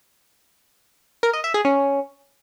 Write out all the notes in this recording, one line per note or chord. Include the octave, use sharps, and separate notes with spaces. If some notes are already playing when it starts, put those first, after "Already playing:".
A#4
D#5
E5
G#4
C#4